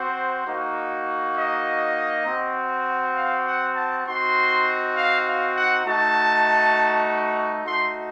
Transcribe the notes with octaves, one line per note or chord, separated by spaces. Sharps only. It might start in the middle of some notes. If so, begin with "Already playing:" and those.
Already playing: C4 F#4 C5
A#3 D#4 F#4
D#5
C4 F#4
F5
F#5
A5
C4 D#4 F#4 C6
F5
F5
F#5
A3 D#4 F#4 A5
A3 D#4 F#4 C6